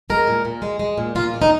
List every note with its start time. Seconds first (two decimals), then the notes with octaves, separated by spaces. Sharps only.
0.10 G#3 A#4
0.28 A#2
0.45 A#2
0.62 G#3
0.79 G#3
0.98 A#2
1.15 A#2 F4
1.34 G#3
1.42 D#4